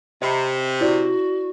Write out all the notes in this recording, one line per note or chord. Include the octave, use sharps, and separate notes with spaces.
C3 D#5 B5
E4 F#4 D5